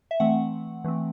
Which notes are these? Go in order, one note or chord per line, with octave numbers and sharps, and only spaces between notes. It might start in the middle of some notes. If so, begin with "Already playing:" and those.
E5
E3 A3 C4 F#5
E3 A3 C4